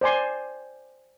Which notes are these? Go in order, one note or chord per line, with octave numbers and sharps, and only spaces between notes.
C5 D5 G#5 C6